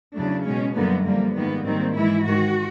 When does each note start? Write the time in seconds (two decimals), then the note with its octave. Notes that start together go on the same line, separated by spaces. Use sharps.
0.14 E2 C#3 F#3 A3 D4
0.45 B2 G#3 C#4
0.75 F#2 D3 G3 A#3 B3
1.05 F2 D3 G3 A#3
1.35 G#2 D#3 G3 A#3 B3
1.65 G#2 D#3 G3 A#3 C4
1.95 G#2 E3 G#3 E4
2.25 G#2 D#3 G#3 F#4